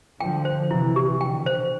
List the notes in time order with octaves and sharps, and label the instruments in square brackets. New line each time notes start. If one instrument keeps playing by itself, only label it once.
[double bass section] D3 F3 [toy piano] G5
[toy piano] C5
[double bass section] C3 E3 [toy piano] E4
[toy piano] G4
[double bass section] B2 D3 [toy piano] G5
[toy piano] C5